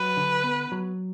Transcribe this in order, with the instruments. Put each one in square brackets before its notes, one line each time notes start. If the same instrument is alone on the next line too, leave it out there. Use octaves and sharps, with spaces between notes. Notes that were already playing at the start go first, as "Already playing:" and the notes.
Already playing: [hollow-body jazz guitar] F#3 [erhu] B4
[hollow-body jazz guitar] D3
B3
F#3